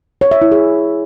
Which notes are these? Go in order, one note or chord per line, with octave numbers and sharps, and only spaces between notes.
C#5
E5
E4
G#4